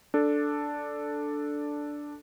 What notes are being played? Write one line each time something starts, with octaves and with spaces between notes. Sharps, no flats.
D4 A4